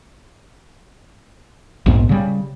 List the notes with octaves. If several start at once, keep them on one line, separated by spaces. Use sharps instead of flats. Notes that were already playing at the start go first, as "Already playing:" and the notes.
A#1 D#2 G#2 B3
C#3 G3